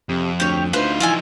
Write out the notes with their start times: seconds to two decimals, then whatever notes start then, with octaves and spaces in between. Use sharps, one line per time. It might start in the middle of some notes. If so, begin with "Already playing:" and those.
0.09 F2 C3
0.40 D2 G4 C#5
0.73 D2 D#4 F4 B4 C5
1.00 E3 F3 D#4 F4 A4 G#5